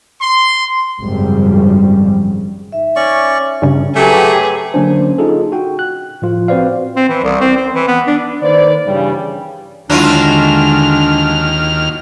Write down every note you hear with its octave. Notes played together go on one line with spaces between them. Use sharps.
C6
G#1 F#2 C#3 F3 G3
D#4 E5
C#4 D5 C#6
G2 C#3
F#3 A3 G4 G#4 B4
D3 F#3 A#3 C#4 D4 C5
D#4 F4 G#4 A4
F#4 G5
F#6
A2 F3 F4
C4 F#4 B4 C5 D5 F5
C4
E3
C2
C4
C4
E3
B3
D4
D#3 A#3 B4 C5 D5
G2 C#3 E3 G3
D#2 D3 F#3 G#3 D4 E4 F4 F6